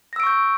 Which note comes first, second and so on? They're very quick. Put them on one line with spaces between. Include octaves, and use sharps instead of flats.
A#6 E6 D7 C#6 G6